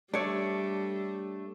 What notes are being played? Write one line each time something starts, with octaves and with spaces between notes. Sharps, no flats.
G3 A3 D4 C#5 D5